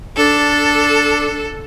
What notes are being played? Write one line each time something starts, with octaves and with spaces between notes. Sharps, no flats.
D4 A4